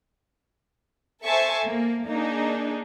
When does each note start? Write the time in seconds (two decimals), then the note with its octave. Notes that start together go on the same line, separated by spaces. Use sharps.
1.24 A4 C5 E5 G#5 A5 C#6
1.65 A#3
2.06 A#3 D4 D#4 G#4